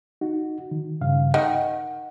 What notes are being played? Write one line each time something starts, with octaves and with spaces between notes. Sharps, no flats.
D#4 F#4
D#3
G2 C#3 F5
D#3 F#5